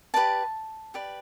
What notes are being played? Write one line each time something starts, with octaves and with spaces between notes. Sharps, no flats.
G4 B4 D5 A5
G4 B4 D5